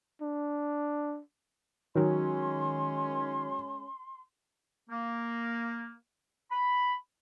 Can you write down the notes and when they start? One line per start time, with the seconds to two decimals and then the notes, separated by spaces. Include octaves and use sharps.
0.22 D4
1.95 D#3 F#3 G#3 C#4 C6
4.90 A#3
6.52 B5